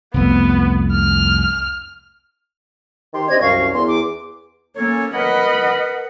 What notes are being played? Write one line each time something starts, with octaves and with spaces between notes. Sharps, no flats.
C2 F2 A3 B3
F6
D#3 G4 C6
C3 D4 D#5 G#6
C2 F#2 F5 C#6
E2 C6
D6
A#3 C#4 A4 C#5
A#4 B4 D#5 F#5 B5